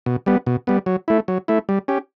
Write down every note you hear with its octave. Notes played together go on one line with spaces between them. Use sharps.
B2
G3 B3
B2
G3 B3
F#3
A3 E4
F#3
A3 E4
G3
C#4 G4